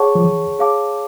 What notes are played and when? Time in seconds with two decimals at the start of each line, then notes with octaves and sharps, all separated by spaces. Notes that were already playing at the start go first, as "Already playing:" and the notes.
Already playing: G#4 C#5 F#5 A5 C#6
0.15 F3
0.24 E3
0.59 G#4 C#5 F5 A5 D6